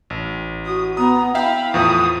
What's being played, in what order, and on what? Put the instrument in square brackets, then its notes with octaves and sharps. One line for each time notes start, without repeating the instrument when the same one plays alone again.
[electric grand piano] A1
[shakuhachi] F#4 [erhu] D#6
[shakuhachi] B3 [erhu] A#5 [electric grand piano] D#6
[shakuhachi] E4 [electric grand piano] E5 F5 G5 [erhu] B5
[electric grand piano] E2 A2 F3 [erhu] D#6